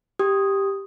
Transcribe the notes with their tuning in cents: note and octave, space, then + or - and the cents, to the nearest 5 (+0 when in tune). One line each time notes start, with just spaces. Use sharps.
G4 +0 D#6 +0